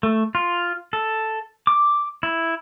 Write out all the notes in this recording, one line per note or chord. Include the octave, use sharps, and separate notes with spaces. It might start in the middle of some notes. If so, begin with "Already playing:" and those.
A3
F4
A4
D6
E4